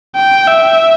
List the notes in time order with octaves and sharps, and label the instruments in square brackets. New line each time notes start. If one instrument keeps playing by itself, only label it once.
[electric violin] G5
E5